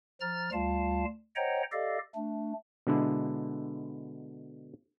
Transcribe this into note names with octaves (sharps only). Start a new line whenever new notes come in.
F3 A#5 F6 A6
D2 G3 F4 F5 A5
C5 C#5 D#5 F#5 G5 A#5
G4 A4 D5 D#5 F5
A3 D4
B2 D3 G#3 D4 E4